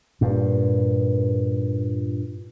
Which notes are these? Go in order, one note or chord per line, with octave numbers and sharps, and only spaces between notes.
G2 A#2